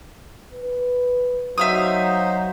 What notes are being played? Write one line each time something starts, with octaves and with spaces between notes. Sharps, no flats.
B4
F#3 D#4 C5 E5 F5 D#6